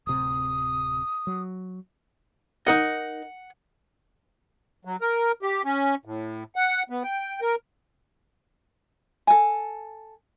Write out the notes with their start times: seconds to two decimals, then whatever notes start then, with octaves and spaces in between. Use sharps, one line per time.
0.07 D1 C3 D#6
1.27 F#3
2.67 D#4 A#4 D#5 F#5
4.85 F#3
5.01 A#4
5.43 G4
5.65 C#4
6.05 A2
6.56 F#5
6.90 B3
7.04 G5
7.42 A#4
9.27 A4 G#5